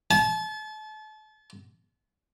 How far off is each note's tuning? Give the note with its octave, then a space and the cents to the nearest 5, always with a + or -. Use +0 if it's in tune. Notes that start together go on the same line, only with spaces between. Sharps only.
A5 -35